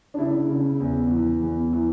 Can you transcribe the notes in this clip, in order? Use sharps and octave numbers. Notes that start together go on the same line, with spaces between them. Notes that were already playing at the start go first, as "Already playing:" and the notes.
D4
C#3 E4
C#3
E2
E3
E2
E3